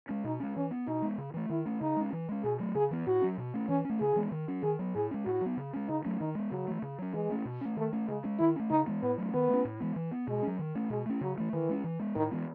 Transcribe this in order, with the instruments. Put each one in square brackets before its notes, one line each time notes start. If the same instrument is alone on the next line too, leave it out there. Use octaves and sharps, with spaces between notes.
[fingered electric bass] G#3 C#4
[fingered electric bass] B2 [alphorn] D#4
[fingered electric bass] G#3 C#4
[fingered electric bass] E3 [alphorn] C#4
[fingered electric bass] B3
[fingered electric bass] B2 [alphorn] D#4
[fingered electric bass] G#3 B3
C#3
E3 A3
[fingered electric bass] D#3 [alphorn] E4
[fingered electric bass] A3 C#4
[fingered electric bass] C#3 [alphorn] D#4
[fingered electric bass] G#3 C#4
E3
G#3 C#4
[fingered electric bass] B2 [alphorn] G#4
[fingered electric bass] F#3 A3
[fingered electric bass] C#3 [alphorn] G#4
[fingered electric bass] E3 B3
[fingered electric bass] A2 [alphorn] F#4
[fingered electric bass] F#3 C#4
B2
A3 C#4
[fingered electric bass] E3 [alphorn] C#4
[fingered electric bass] C#4
A3
[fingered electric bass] C#3 [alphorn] G#4
[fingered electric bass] E3 G#3 B3
D#3
F#3 C#4
[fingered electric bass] D#3 [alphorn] G#4
[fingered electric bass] F#3 B3
[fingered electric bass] A2 [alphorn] G#4
[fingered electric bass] G#3 C#4
[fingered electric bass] A2 [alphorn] F#4
[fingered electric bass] F#3 B3
C#3
G#3 C#4
[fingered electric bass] C#3 [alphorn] D#4
[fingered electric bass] F#3 A3 C#4
[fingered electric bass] D#3 [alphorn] D#4
[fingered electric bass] G#3 B3
[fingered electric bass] C#3 [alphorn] F#3
[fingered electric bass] E3 A3
C#3
F#3 C#4
[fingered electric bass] E3 [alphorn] G#3
[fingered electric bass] A3 C#4
B2
A3 C#4
[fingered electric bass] D#3 [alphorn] A3
[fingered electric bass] A3 C#4
[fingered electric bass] C#3 [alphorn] G#3
[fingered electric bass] G#3 C#4
[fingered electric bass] D#3 [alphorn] E4
[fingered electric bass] A3 C#4
[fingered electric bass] C#3 [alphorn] D#4
[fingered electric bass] E3 G#3 B3
[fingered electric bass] A2 [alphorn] B3
[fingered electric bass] F#3 A3 C#4
[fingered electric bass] D#3 [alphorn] B3
[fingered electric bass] A3 C#4
A2
E3 G#3 B3
E3
B3
[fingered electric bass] B2 [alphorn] G#3
[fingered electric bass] F#3 C#4
D#3
A3 C#4
[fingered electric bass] B2 [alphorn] G#3
[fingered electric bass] A3 C#4
[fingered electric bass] C#3 [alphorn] F#3
[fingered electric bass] E3 A3
[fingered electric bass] D#3 [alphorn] E3
[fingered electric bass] G#3 C#4
E3
G#3 B3
[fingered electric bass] A2 [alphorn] D#3
[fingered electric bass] E3 G#3 B3